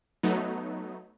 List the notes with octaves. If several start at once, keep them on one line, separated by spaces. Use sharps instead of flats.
F#3 A3 B3 D#4